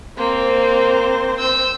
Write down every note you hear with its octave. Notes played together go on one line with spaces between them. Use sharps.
A#3 C4 C5
E6 G6